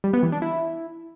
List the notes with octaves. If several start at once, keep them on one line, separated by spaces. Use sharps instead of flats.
G3
B3
E3
D4
E4